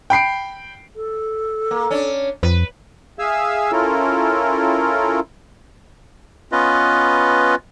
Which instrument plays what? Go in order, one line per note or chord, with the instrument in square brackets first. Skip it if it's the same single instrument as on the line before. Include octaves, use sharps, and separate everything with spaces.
[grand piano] G5 B5 C7 D7
[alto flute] A4
[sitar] A#3
C#4 D4
[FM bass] F2 [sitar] B4
[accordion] G#4 E5 F5 G#5 E6
C#4 E4 F4 A4 A#4
[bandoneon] B3 C#4 F4 B4 D#5